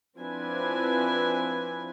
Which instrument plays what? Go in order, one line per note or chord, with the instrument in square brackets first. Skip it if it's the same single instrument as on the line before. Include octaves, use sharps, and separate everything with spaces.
[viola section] F3 C4 D4 E4 B4 G#5